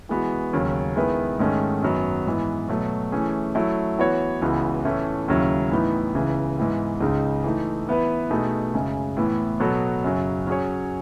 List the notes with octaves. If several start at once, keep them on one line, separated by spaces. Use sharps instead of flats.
E3 G#3 B3 F#4
D#2 C#3 F#3 C#4
D#3 G#3 B3 E4 B4
G#2 D#3 A3 C#4 G#4
F#2 D#3 F#3 B3
G#2 E3 B3
B2 F#3 A3
E3 A3 C#4 G#4
F#3 A3 E4
E3 B3 F#4 C#5
C#2 C#3 E3 B3 F#4
A2 E3 A3 C#4
D#2 C#3 F#3 C#4 E4
A2 E3 B3 D#4
C#2 C#3 E3
G#2 E3 B3
C#2 C#3 G#3 D#4
E3 A3 D#4
E3 B3 E4 B4
B2 A3 D#4 G#4
F#2 C#3 G#3
A2 E3 B3
B2 F#3 B3 F#4 A4
F#2 C#3 F#3
F#3 C#4 G#4 C#5